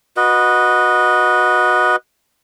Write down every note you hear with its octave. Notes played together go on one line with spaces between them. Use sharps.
F#4 B4 D#5